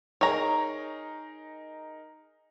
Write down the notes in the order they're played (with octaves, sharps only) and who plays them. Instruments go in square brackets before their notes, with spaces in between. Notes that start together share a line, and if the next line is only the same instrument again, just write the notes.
[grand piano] D#4 G#4 A#4 [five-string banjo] C#5 A#5